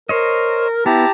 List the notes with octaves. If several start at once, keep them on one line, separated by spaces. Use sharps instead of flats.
A#4 C5 C#5 D#5
B3 E4 G4 A5 A#5